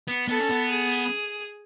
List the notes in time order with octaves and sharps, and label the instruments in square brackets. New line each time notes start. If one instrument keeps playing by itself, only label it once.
[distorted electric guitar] B3
[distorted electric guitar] B3 [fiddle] A4
[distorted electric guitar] C#4
B3
[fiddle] G#4